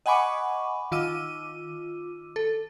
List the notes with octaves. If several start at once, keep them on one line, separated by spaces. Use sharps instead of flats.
D#5 F#5 G#5 B5 C#6 D6
D#3 F4 D6 E6 D#7
A4